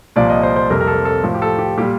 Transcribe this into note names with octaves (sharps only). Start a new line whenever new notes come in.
C2 A#2 F3 D5
D#5
C5
C5
F2 C3 G3 A#4
A#4
A4
A4
A2 F3
G4
A4
G4
A#2 G3 G4